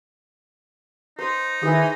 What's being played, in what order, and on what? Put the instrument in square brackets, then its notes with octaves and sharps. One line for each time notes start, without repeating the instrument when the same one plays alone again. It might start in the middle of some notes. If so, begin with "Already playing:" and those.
[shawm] D#4 [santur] C5
[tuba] D#3 [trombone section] E3 [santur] G#4